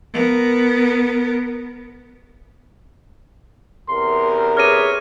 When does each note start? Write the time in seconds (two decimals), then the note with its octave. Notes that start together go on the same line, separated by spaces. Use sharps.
0.13 B3 A#4
3.89 E2 C3 A#4 C6
4.57 G#4 B4 C#5 D6 F6 A#6 D#7